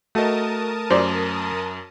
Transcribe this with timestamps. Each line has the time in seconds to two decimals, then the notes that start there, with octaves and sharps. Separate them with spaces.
0.15 A3 F#4 A4 A#4 D#5 A5 D#6
0.90 F#2 C5 D5